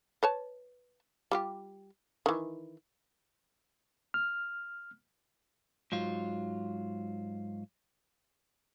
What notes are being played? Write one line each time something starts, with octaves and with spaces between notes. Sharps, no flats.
B4 C#5 A5
G3 F4 G4
D#3 E3
F6
G#2 F#3 F4